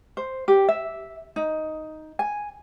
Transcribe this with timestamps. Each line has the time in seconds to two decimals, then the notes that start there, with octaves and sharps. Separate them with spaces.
0.17 C5
0.48 G4
0.69 E5
1.36 D#4
2.19 G#5